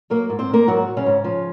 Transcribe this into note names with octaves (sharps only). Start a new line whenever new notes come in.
F#3 A#3 A#4
G#2
C4 C5
D#3 A#3 A#4
G#2 F#3 F#4
F#3
C#3 C#4
G#2
F3